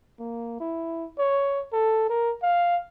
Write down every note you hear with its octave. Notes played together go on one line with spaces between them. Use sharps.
A#3
E4
C#5
A4
A#4
F5